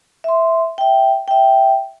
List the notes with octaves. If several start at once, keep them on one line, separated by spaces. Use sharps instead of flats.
E5 C6
E5 G5
E5 G5